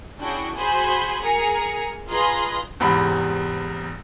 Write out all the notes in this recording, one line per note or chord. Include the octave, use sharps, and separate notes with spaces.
C#4 D4 E4 F#4 G#4 G5
F#4 G#4 C5 G#5 B5 C6
G#4 A#4 G#5 A#5 C#7
F4 G#4 B4 D#5 A#5 C6
E2 G#2 C3 G3 B5